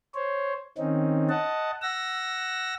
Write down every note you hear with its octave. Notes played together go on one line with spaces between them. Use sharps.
C5 C#5
D#3 C4 C#4 D#4
D#5 F#5 A5
F#5 E6 A#6